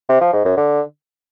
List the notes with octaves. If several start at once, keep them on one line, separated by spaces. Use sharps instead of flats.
C3
F3
G#2
F#2
D3